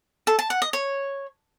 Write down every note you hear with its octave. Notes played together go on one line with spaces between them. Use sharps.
A4
A5
F#5
D#5
C#5